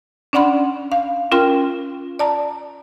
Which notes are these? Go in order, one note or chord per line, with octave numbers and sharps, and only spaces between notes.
C#4 D4 D5 F#5 B5 C6
F5
C#4 F4 A#4 G5 C6
D5 A5 A#5